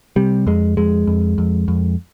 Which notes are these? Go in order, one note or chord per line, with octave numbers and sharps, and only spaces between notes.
C3 G3
F2 G#3
F2 G#3
F2
F2
F2